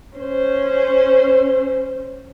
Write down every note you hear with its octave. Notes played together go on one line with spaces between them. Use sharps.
C#4 C5